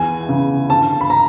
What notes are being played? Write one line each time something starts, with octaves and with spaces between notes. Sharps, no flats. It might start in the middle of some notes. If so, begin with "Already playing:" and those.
Already playing: E2 G#5
C#3
D3 A5
B5
A#5